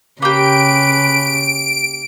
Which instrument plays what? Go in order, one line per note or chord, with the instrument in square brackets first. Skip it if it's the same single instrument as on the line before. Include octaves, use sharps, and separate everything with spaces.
[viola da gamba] C#3 [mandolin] A#3 G4 [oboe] B4 [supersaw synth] D7